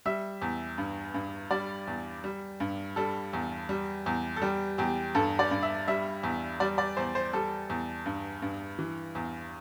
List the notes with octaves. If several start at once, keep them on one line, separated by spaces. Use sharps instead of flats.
G3 E5
E2
G2
G2
G3 D5
E2
G3
G2
G3 A4
E2
G3
E2
A4
G3 G4
E2 G4
G2 A4
D5
G2
E5
G3 E5
E2
G3 D5
D5
E2 C5
C5
G3 A4
E2
G2
G2
E3
E2